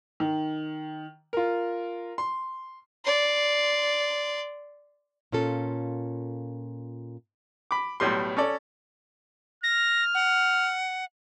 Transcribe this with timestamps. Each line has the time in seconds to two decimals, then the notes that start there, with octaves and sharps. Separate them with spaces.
0.20 D#3
1.33 F4 A#4
2.18 C6
3.04 D5 C6
5.32 A#2 C#4 F4 A4
7.71 B5 D6
8.00 B1 A2 G3 C6
8.37 C#4 A4 D5
9.63 F6 A#6
10.14 F#5